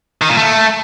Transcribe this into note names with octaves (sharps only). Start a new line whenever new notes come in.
D#3
A#2
A3